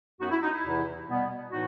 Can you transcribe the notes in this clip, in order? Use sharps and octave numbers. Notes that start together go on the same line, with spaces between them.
F#2 F#3 B3 D#4 F#4
E4
D#4
E4
E2 C3 E3
B2 G3 B3
A2 E3 D#4 F#4